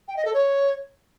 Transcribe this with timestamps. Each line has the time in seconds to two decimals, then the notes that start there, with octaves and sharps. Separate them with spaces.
0.08 G5
0.17 D#5
0.25 A4
0.34 C#5